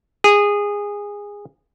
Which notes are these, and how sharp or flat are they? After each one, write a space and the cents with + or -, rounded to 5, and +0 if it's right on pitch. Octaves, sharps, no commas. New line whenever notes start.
G#4 -20